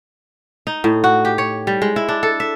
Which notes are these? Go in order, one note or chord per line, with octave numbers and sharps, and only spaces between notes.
D#4
A2
F#4
G4
C#5
G3
G#3
E4
D4
A4
E5